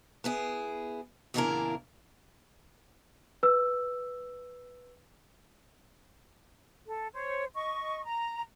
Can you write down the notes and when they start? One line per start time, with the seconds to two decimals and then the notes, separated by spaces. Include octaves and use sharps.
0.24 B3 E4 G#4
1.34 E2 A#2 C#3 D4 E4 A#4
3.43 B4 E6
6.86 A4
7.12 C5 C#5
7.54 D#5 C#6
8.05 A#5